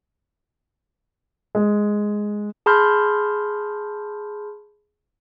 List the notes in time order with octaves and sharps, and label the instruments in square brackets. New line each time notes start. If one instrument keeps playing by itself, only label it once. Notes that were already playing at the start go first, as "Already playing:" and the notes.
[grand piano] G#3
[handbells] G#4 A5 B5 C6 F6 G6